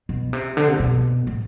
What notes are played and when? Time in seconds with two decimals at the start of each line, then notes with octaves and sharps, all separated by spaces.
0.09 B2
0.33 C3
0.57 D3
0.68 C3
0.80 B2
1.27 A2